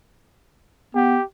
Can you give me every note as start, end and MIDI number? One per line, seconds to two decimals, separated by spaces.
0.95 1.18 59
0.95 1.23 67